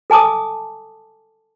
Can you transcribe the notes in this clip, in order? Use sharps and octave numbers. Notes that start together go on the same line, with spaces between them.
A4 G#5 A5 D6 D#6